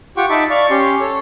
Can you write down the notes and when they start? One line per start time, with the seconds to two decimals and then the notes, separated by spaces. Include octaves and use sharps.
0.17 F4 G4 F#5 G5 C#6
0.30 D#4 E5 A5 B5 D6
0.50 D5 F5 C#6
0.70 C#4 G4 C6
1.00 A4 C#5